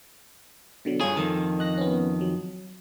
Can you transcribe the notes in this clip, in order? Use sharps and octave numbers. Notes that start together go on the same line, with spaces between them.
B2 D3 F#3
G2 F4 G#4 A4 C#5
F2 D#3 A4
D#5 F#6 A#6
B3 C#4
F#3